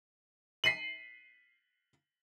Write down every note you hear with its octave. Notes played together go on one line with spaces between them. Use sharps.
B6 C7 D#7 F#7